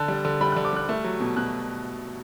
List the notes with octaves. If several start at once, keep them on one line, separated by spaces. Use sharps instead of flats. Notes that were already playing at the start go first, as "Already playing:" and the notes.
Already playing: D3 A5
G3
D3
G3 B5
D3 F#6
D6
G3 F#6
A3
F#3
B2
B2 F#6